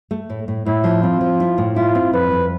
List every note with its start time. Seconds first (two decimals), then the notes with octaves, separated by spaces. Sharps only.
0.11 A3
0.30 A2
0.48 A2
0.66 A2 E4
0.84 F3
1.02 C4 F4
1.21 F3
1.40 E4
1.58 A2
1.76 E4 F4
1.95 C4
2.13 F2 B4
2.32 F2